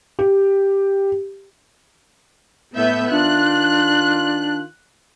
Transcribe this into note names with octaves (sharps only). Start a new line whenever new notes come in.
G4
A2 B3 E5 G6
D#3 D4 F4 F#6